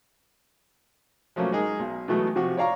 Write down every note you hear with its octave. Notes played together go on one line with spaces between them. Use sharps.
F3 F#3 A3 A#3 C#4
G#3 D#4 G#4 A#4
B1
B2 E3 F#3 G#3 A3 B3
C3 F3 F#4
C#5 D5 F5 A#5 C#6